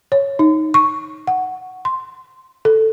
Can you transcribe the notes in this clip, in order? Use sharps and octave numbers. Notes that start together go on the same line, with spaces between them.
C#5
D#4
C#6
F#5
C6
A4